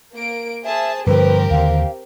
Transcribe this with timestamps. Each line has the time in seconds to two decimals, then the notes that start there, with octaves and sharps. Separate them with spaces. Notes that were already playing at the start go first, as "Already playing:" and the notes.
0.16 A#3 D7
0.65 G#4 C5 E5 A5
1.07 G2 D3 F3 C4 G4 A#4 B4
1.51 D#2 D3 F5